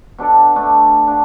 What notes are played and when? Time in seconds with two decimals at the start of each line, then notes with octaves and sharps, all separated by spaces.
0.18 B2 D4 A4 D5
0.56 A3 D4
0.84 F4
1.08 D4 F#4